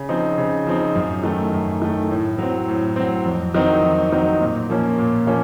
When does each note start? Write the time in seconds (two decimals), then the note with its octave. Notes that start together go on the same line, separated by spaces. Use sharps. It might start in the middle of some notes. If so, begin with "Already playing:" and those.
Already playing: C#3
0.09 F3 C4 D#4
0.38 C#3
0.67 F3 C4 D#4
0.95 F#2
1.24 D#3 A3
1.53 F#2
1.82 D#3 A3
2.11 A2
2.39 F#3 C4
2.68 A2
2.96 F#3 C4
3.26 F2
3.55 D#3 F#3 C4 D#4
3.84 F2
4.12 D#3 F#3 C4 D#4
4.40 A#2
4.70 F3 A#3 C#4
4.98 A#2
5.27 F3 A#3 C#4